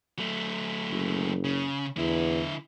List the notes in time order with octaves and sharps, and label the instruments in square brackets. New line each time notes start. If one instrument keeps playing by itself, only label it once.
[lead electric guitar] F#3 A3
[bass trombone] F#1
[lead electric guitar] C#3
[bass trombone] E2 [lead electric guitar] D3 E4